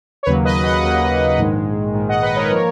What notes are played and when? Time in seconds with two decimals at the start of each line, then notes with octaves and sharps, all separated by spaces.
0.23 C#5
0.26 D#2 C#3 F#3 A#3 B4
0.45 B4 D#5
0.64 D#5 F#5
0.82 D#2 C#3 F#3 A#3 D#5 F#5
1.38 A#1 G#2 D#3 G#3
1.94 A#1 G#2 D#3 G#3
2.09 D#5 F#5
2.22 B4 D#5
2.36 A#4 C#5
2.50 F3 A#3 A#4 C#5